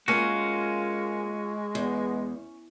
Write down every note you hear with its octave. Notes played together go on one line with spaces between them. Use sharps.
G#3 A#3 C#4 F4 F#4
E2 B3